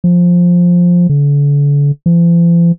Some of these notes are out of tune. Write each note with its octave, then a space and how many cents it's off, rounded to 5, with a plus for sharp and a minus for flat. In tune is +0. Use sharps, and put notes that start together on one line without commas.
F3 +10
D3 -40
F3 -45